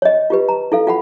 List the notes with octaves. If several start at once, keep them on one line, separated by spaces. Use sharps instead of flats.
C#5 D#5
F4 G4 B4
A#5
E4 A4 F5
F4 F#5 B5